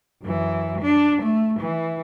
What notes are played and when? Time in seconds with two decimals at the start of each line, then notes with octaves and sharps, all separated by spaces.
0.22 F#2 E3
0.82 D4
1.23 A3
1.60 E3